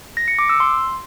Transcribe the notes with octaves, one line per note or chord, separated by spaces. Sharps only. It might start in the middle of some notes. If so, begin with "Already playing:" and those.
A#6
C#7
D6
E6
C6